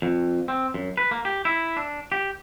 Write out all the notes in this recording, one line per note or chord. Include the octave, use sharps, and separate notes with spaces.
F2
C4
F#2
B4
A#3
G4
E4
D4
G4